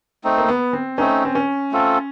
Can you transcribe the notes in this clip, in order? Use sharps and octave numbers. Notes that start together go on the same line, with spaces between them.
A3 C4 D#4
A#3
B3
C4
A3 C4 C#4 D#4
C4
C#4
A3 C4 F4 A4